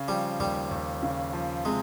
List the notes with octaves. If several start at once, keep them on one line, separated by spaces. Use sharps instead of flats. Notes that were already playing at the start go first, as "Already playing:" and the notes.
Already playing: C#3
F3 G3
D#2 G3
D#2
C#3
F3
C3 G#3